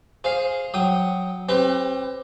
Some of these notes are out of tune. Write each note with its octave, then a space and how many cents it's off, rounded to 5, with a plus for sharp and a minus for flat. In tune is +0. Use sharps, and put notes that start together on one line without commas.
G#4 +0 C5 +15 F5 +0
F#3 +0 G5 +0 D#6 +0
C4 +40 G4 +0 B4 +40